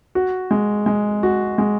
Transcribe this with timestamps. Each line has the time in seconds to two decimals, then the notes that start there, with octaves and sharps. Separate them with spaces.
0.15 F#4
0.51 G#3
0.86 G#3
1.23 F#4
1.58 G#3